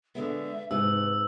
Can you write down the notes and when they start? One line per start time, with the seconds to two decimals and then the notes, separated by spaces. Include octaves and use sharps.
0.15 D3 G#3 B3 E5
0.71 G#2 C3 B4 E6